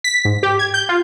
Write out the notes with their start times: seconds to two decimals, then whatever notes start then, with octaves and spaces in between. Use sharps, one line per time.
0.04 B6
0.25 G#2
0.43 G4
0.59 G#6
0.74 G6
0.89 F4